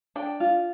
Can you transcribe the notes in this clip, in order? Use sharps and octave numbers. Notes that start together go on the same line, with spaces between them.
D4 G5
F4